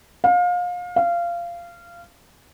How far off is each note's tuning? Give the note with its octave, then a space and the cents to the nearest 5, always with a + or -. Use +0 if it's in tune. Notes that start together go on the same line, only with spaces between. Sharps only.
F5 +30
F5 -20